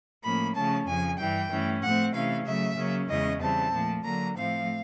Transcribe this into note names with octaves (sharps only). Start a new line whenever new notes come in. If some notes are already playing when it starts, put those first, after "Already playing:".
A2 F3 A#3 C#4 B5
C#3 F3 A3 C#4 A5
F2 C#3 F3 G#5
G2 E3 G3 G5
G2 E3 A3 C#4
A2 F3 A3 C4 F#5
C3 E3 A3 C#4 F5
C#3 F#3 A3 E5
C#3 F#3 A#3 C#4
E2 C#3 E3 G#3 C#4 D#5
C#3 E3 G3 C4 A5
A#2 F3 A3
D3 F#3 A#3 A#5
A2 F3 A3 C4 F5